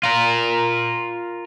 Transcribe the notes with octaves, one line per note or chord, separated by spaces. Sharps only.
F4 A#4